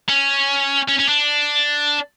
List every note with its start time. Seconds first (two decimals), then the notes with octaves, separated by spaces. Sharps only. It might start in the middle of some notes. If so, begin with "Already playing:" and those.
0.09 C#4
0.88 C#4
0.99 C#4
1.08 D4